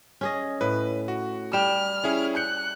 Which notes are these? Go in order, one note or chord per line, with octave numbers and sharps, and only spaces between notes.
C#4 G#4 D#5
A2 B4
F#4
G3 G5 F6 E7
C#4 E4 G#4
F#6 G6 C#7